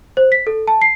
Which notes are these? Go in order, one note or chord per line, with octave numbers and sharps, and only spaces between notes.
C5
B6
A4
A5
C7